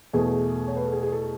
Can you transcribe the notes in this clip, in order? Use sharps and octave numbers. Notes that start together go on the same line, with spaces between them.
E2 B2 A3 G#4
C#5
B4
A4
G#4
G#4
A4